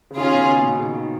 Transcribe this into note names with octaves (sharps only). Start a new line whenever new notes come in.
C#3
D#3 C#4 F4 G#4
B2
C#3
A#2
B2
D#3
C#3
D#3